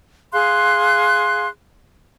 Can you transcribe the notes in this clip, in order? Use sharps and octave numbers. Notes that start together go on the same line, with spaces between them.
G#4 F5 C6 F#6